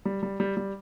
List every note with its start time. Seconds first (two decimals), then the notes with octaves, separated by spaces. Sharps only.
0.05 G3
0.23 G3
0.40 G3
0.57 G3